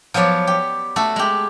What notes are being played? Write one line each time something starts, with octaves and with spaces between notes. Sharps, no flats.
F3 F#3 B3 C#5 D5
G4
A3 F#4 A4
G#3 G4